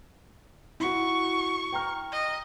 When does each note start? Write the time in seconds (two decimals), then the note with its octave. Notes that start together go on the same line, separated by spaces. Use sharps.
0.80 E4 F#4 C#6
1.73 G5 A#5 F6
2.12 D#5